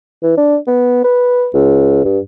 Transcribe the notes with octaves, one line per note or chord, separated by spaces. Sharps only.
E3
D4
B3
B4
C#2
G2